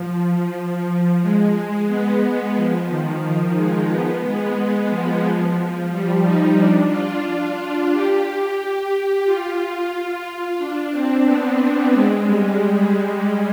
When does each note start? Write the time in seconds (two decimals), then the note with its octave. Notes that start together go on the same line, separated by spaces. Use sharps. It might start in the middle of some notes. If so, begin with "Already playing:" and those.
Already playing: F3
1.22 G#3
1.88 B3
2.23 G#3
2.56 F3
2.89 D#3
3.55 G#3
3.90 B3
4.23 G#3
4.57 G#3
4.90 F3
5.91 G3
6.24 D#4
6.57 D4
6.91 F4
7.24 F4
7.57 F4
7.91 G4
9.25 F4
9.93 F4
10.58 D4
10.92 C4
11.26 B3
11.93 G#3
12.26 G3
12.60 G3